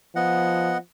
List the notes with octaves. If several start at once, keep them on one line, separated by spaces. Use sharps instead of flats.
F3 B3 D#5 F#5